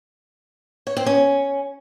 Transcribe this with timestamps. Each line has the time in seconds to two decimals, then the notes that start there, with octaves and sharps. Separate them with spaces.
0.87 C#5
0.97 C4
1.06 C#4